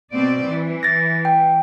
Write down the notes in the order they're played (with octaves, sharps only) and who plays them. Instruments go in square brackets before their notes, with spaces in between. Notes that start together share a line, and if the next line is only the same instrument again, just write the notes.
[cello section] B2 C4 D5
E3
[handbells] A6 A#6
G5